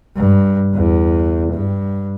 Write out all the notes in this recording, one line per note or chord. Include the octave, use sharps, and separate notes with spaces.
G2
E2
G2